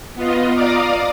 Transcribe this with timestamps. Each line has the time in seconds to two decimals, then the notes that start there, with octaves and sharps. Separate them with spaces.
0.15 B3 F4 D#5
0.54 D5 F5 A#5 D6 D#6